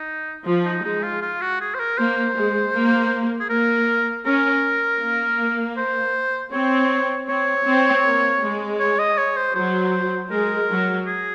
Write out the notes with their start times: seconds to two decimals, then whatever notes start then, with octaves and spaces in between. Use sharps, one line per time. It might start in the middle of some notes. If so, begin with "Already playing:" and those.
Already playing: D#4
0.46 F3
0.65 D#4
0.84 G#3 D#4
1.03 F4
1.22 F4
1.41 F#4
1.61 G#4
1.75 C5
1.80 A#4
1.98 A#3 C5
2.36 G#3
2.73 A#3
3.40 G#4
3.50 A#3 A#4
4.25 C#4 A#4
5.02 A#3
5.77 C5
6.52 C4 C#5
7.28 C4 C#5
7.66 C4
8.05 A#3
8.42 G#3
8.80 C#5
8.99 D#5
9.18 C#5
9.36 C5
9.55 F#3 C5
10.31 G#3 A#4
10.70 F#3
11.07 G#4